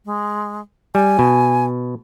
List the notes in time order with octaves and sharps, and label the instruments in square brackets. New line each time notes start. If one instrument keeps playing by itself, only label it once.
[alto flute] G#3
[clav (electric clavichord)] G3 [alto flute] G#5
[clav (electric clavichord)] B2